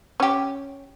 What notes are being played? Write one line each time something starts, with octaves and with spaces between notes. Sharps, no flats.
C#4 G4